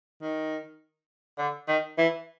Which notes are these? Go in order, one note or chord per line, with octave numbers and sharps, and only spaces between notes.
D#3
D3
D#3
E3